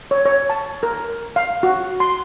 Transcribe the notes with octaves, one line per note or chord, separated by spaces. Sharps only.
C#5
C#5
A5
A#4
F5
F#4
C6